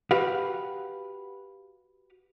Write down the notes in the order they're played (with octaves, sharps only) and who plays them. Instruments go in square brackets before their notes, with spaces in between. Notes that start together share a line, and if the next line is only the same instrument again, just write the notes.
[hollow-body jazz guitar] F#4 G4 B4 F5 F#5